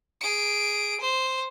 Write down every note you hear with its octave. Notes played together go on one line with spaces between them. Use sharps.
G#4 D7
C5